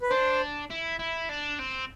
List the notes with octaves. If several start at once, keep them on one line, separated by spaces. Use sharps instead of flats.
B4
D4 C5
E4
E4
D4
C4